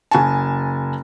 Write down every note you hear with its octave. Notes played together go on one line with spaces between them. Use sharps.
F#1 G#5 A5